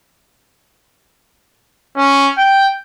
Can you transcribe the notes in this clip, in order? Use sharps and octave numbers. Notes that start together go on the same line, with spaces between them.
C#4
G5